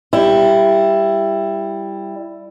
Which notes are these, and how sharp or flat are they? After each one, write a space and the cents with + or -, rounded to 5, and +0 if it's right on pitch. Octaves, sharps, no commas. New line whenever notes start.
G3 +10 E4 +15